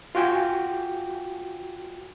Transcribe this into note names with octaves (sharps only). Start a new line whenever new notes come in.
F4 F#4 G5 G#5